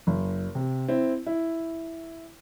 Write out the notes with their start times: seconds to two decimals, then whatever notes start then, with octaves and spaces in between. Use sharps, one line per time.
0.07 F#1
0.55 C3
0.88 C4 E4
1.26 E4